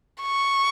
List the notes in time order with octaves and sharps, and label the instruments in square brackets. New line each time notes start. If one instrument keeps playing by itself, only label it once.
[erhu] C#6